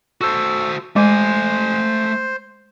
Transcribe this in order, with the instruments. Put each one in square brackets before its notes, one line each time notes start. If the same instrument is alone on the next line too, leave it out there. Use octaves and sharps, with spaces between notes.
[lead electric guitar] F#4 C5 [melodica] A4
[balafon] G#3 [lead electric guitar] A3 G#5 [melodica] C5